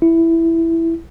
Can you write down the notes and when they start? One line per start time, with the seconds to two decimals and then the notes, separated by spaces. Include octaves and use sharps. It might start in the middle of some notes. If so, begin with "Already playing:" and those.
0.02 E4